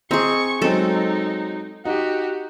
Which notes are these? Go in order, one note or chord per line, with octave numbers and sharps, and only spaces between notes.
C4 G#4 D#5 A#5 C6 C#6
F#3 G#3 C4 D#4 A4
D#4 F#4 G4